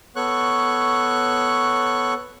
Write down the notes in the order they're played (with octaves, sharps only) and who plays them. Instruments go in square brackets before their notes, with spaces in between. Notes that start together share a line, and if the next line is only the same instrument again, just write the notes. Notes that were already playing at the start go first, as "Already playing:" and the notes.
[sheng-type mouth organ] B3 A4 C#5 C#6 F#6